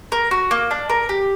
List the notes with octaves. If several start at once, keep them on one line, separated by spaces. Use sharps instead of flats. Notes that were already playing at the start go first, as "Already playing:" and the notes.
A#4
F#4
A#3
D4
A#4
G4